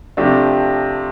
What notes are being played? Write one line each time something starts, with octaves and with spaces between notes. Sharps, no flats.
C3 F3 A3 D4 G4